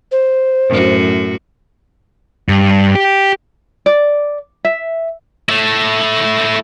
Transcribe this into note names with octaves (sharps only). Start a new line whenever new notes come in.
C5
F#2 A2 F#4
G2
G4
D5
E5
A3 E4